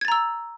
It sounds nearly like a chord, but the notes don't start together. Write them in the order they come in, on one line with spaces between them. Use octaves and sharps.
G#6 A6 A#5 E6